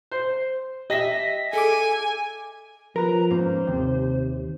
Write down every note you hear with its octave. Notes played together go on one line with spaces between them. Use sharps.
C5
G4 D#5 E5 A#6 B6
G#4 A4 G#5 D6
F3 A#4 B4 A#5
G#2 A#3 C#4 C5
D#2 C3